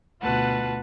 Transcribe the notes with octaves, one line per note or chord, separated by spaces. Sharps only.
D2 B2 F4 B4 F#5 A5